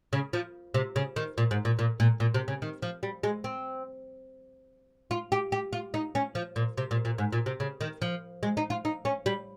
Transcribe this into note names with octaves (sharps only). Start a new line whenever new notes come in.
C#3
F3
C3
C#3
D#3
A#2
G#2
A#2
A#2
A#2
A#2
C3
C#3
D#3
F3
G3
G#3
C4
F4
G4
G4
F4
D#4
C#4
F3
A#2
C3
A#2
A#2
G#2
A#2
C3
C#3
D#3
F3
G#3
D#4
F4
D#4
C#4
G3